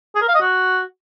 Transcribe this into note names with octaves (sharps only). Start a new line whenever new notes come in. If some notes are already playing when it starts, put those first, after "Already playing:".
G#4
A#4
F5
D#5
F#4